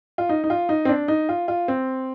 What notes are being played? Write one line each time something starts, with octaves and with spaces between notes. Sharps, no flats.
F4
D#4
D#4
F4
D#4
C4
D4
D#4
F4
F4
C4